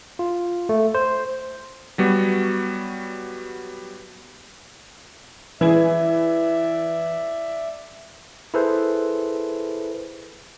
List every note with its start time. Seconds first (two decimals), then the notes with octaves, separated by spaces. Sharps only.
0.19 F4
0.69 A3
0.95 C5
1.98 F#3 G3 B3 F#4
5.61 E3 E4 G#4 D5 E5
8.54 E4 G#4 A4 B4 C5